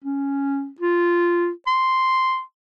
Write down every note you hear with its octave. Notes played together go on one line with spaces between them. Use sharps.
C#4
F4
C6